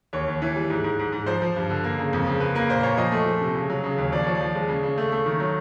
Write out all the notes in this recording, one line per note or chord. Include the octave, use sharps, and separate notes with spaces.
D#2 C#5
D#2
E3
G3
G#2
G#2
G#2
G#2
F3 C5
F3
G2
D3
A#3
C#3
F2
C#3
A#3 B4
A#3 B4
A#2 C5
C5
A#2 C#5
F3 D#5
A3
F3
C3
C#3
F#3
C#3
D#2
F3 D5
F3 C#5
D5
F3
G#3
C#3
C#3
A3
A3
D#3
F#3